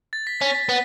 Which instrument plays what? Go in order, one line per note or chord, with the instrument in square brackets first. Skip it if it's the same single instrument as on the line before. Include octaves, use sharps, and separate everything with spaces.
[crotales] A6
B6
[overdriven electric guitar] C#4 [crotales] B6
[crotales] B6
[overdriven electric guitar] B3 [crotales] B6